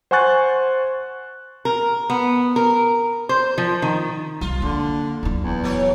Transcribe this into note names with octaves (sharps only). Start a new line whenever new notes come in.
C5 F#5 G#5 C#6 F#6 A6
A#4
B3
A#4
C5
F3
D#3
C2 F4
D3 A#3
D1 E4
E2
F#3 C#5 D5